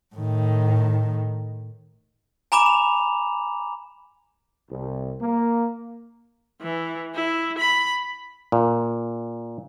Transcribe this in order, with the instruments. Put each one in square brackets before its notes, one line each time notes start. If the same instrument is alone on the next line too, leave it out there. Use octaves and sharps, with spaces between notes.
[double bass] A2 D#3
[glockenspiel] G#5 A#5 B5 D6 E7
F7
[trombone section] C2
A#3
[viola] E3
E4
B5
[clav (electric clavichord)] A#2